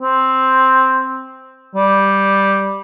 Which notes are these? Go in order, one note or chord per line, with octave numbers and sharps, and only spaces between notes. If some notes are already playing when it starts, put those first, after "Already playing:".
C4
G3